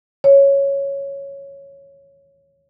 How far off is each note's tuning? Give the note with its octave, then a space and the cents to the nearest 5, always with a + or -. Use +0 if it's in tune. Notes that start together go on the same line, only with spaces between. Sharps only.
C#5 +0